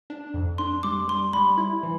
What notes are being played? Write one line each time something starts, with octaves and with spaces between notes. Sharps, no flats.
D4
F2
D4 C6
G3 D6
G3 C6
G3 B5
E4
E3